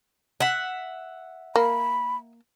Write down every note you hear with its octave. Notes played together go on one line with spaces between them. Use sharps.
E5 F#5
A#3 B5